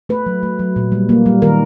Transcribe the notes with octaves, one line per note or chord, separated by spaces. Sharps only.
A3 B4
F#3
A3
F#3
A#2
G3
A#3
G3
D#3 A#4